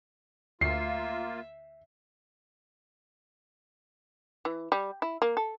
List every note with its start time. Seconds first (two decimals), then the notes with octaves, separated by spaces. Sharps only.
0.61 D2 A#3 F4 E5 C7
4.45 E3
4.72 G3
5.02 E4
5.22 A#3
5.37 A4